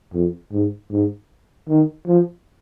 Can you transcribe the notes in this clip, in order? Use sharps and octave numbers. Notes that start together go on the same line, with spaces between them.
F2
G#2
G#2
D#3
F3